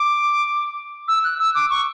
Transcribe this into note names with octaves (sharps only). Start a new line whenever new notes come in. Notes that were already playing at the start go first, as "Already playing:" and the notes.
Already playing: D6
E6
F#6
E6
D6
C#6